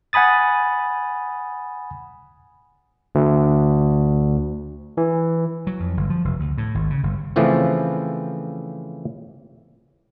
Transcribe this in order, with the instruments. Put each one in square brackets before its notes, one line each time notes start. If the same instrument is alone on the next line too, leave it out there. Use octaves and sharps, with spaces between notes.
[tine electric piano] F#5 G#5 B5 D#6 A6
D2
E3
[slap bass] F#3
F2
G1
F3
F1
D2
A2
G#1
C#3
G1
[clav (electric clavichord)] C#3 E3 F3 A3 C4 C#4